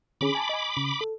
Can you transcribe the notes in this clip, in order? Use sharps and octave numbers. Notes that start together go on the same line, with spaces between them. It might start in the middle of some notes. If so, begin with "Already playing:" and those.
D3 C#4 G#4 B5 D6
G#5 A5
D#5 G#5
C#3
A4